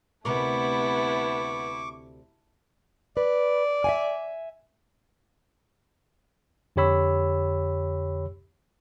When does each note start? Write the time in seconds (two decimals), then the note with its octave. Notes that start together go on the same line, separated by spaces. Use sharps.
0.25 D2 C3 A3 B3 E4 A#4 C#6 D6
3.17 B4 D5
3.84 E5 F5 G#5
6.76 F2 D3 G4 C#5 B5 E6